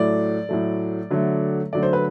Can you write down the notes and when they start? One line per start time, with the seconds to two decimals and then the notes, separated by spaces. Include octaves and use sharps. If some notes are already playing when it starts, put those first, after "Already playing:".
Already playing: A2 F#3 A3 D5
0.49 A2 F#3 A3
1.11 D3 F#3 A3
1.73 D3 F#3 A3 D5
1.83 C5
1.93 B4